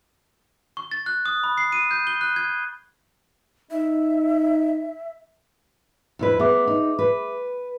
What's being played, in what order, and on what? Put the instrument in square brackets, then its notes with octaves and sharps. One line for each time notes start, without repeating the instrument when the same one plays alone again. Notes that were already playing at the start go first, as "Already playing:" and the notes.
[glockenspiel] C#6
A6
F#6
D#6
B5
C7
D#7
G6
G7
F#6
G#6
[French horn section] D#4 [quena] E5
[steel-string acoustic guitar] F2 E4 B4
[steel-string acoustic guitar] B3 [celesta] G#4 E5 D6
[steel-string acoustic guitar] D#4
B4